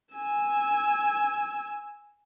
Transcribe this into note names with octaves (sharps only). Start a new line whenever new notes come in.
G#5 E6